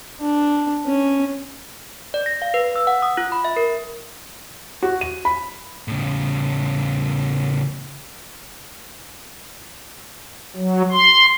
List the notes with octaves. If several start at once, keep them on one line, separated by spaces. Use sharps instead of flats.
D4
C#4
D5
A#6
F5
B4
E6
F#5
D#6
F4
B5
E5
A#4
F#4
D#7
B5
A2 C#3
F#3
C6